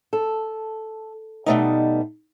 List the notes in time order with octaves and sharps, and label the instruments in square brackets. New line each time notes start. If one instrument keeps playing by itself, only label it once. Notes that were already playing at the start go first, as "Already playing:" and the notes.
[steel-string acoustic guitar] A4
B2 F#3 G3 A3 B3 D#4